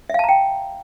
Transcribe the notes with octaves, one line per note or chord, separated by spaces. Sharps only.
E5 F5 G5 A5 A#5